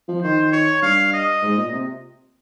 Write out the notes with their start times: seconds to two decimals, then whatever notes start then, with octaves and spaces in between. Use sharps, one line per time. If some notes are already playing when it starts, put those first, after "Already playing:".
0.08 F3
0.22 D#3 C5
0.52 C#5
0.82 G2 F5
1.13 D#5
1.42 G#2
1.57 A#2
1.72 C3